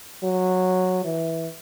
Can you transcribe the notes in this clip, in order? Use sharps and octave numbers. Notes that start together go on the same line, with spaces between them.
F#3
E3